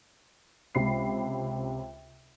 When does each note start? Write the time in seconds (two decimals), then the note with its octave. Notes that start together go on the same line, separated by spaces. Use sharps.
0.75 C#2 C3 B5 C7